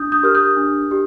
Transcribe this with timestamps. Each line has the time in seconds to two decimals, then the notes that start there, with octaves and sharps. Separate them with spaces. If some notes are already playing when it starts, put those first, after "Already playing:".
Already playing: D4 D#6 G6
0.12 D#6 G6
0.23 G4 A#4 F6
0.35 D#6 G6
0.57 D4
0.91 G4